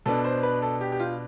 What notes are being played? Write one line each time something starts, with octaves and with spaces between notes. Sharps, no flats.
B2 B3 D4 A4
C5
B4
A4
G4
G4
F4